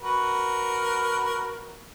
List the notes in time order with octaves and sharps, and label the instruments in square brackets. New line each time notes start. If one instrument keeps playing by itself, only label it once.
[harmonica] F#4 A#4 B4